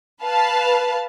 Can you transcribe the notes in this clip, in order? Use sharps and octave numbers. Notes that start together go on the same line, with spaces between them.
B4 F5 A5